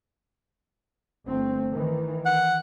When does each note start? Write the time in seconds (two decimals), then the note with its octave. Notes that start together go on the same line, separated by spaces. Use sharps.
1.25 G1 A3 C4
1.71 D#3 E3
2.26 F#5